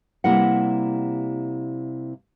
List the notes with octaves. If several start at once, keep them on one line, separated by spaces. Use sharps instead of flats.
C3 G3 A#3 E4 A#4 F#5